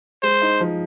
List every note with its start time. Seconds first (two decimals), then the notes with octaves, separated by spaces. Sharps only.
0.23 G#3 C5
0.42 D#4
0.60 F3